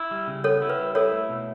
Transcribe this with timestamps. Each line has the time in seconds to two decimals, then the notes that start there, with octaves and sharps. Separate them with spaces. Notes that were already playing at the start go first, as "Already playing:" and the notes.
Already playing: E4
0.11 G3
0.28 C#3
0.44 B3 A4 C#5
0.62 E4
0.70 B4
0.79 G3
0.95 E4 A4 C#5
1.12 A3
1.29 B2